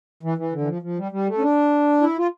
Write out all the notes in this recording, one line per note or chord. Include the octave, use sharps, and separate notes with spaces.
E3
E3
D3
E3
F3
F3
G3
G3
A3
C#4
D4
E4
F4